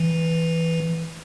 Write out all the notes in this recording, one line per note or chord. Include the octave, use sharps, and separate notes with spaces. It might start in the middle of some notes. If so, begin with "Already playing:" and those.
Already playing: E3